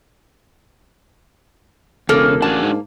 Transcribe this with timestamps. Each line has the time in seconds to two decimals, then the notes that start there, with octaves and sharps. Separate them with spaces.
2.09 E1 C#3 A#3 A4
2.42 A1 D4 F#4 G#4 A5
2.62 G#2